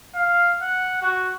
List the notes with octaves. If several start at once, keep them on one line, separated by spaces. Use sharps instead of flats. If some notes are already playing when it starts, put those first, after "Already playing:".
F5
F#5
F#4